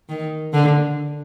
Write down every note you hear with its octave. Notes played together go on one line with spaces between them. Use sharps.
D#3
D3